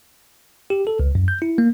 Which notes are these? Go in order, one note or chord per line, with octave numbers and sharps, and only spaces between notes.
G4
A4
C#2
F#2
G6
E4
A#3